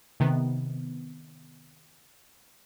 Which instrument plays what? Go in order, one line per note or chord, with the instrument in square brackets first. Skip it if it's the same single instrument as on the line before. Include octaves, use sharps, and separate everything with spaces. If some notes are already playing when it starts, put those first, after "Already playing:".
[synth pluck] C3 D#3 B3